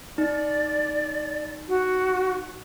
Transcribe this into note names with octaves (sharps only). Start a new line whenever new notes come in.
D#4 D5
F#4